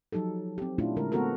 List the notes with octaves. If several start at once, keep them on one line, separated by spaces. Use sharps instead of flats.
F3 F#3 D#4 G4 A4
C4 G4
A#2 A3 C#4 D4 E4 F4
D3 G#3 A#4
A3 B3 C4 F#4 A4 A#4